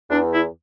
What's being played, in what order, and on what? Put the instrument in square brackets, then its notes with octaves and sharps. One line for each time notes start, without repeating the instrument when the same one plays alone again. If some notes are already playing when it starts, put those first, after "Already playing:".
[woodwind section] E2 D4
E4